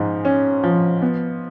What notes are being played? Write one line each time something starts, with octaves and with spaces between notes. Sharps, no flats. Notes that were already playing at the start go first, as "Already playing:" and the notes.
Already playing: G#2 F3
C#4
F3
B3